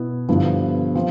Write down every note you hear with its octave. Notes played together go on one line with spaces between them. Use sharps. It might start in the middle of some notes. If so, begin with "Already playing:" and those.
Already playing: B2 B3 E4
G2 D3 F3 B3 E4
F3 C4